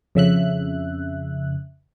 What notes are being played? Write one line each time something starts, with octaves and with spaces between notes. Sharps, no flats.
F2 C#3 E5 F#6